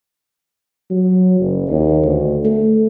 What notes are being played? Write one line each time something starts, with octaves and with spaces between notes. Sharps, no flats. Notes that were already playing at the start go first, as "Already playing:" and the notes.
F#3
F#1
D#2
D2
A3